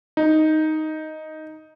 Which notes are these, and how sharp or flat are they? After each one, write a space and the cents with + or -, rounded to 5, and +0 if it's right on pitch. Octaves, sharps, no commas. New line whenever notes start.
D#4 +5